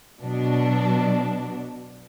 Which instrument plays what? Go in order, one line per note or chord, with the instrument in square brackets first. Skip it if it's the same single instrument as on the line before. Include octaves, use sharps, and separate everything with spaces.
[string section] B2 F#3 D4